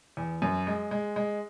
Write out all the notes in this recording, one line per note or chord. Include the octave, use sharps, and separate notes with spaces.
E2
F#2
G#3
G#3
G#3